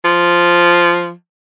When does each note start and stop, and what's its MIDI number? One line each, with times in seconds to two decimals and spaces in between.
0.05 1.12 53